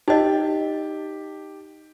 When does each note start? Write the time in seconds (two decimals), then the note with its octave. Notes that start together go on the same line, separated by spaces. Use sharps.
0.08 D#4 G4 D#5